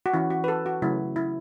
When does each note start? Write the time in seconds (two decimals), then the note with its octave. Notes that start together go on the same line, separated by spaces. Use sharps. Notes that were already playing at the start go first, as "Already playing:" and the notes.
0.06 F#4
0.14 E3 C#4 E4
0.30 F#4
0.44 B4
0.48 A4
0.66 F#4
0.82 C#3 F#3 A3 C#4 E4
1.16 E4